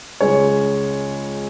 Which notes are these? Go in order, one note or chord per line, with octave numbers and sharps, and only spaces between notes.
C#2 C#3 G#3 C#5